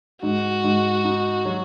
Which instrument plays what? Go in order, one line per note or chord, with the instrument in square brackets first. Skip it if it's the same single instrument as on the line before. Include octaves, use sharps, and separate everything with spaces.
[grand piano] G#2 [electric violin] F#4
[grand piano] G#2
D#4
F#3